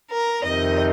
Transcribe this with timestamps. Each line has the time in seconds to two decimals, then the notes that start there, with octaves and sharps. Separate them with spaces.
0.11 A#4
0.44 F2 C3 D#3 D#5